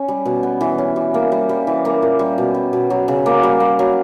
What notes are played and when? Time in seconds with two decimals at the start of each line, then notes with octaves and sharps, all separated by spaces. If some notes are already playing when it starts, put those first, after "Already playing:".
Already playing: C#4
0.08 G3
0.25 B2
0.43 B3
0.61 E3
0.78 C#4
0.96 G3
1.14 A#3
1.32 G3
1.49 G3
1.67 E3
1.85 A#3
2.02 A#2
2.19 G3
2.38 B2
2.54 G3
2.73 B2
2.90 F#3
3.08 C#3
3.26 A#3
3.43 G3
3.60 A#3
3.79 F#3